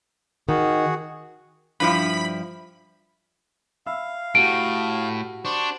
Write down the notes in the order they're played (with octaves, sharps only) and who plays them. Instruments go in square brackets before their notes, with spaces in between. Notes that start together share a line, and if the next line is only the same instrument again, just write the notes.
[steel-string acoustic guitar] D#3 [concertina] F#4 G#4 F#5
[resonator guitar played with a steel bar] G2 F3 E4 [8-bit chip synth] B5
[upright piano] E5 B5 E6 [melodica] F5
[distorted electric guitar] A2 [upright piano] F#4 G4 [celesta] D7
[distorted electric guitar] D4 [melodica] C5 C#6